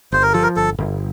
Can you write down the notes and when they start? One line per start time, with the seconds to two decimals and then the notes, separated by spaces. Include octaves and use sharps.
0.12 G1 C5
0.23 A#4
0.33 F3 A4
0.43 A#4
0.56 G1 A4
0.79 G1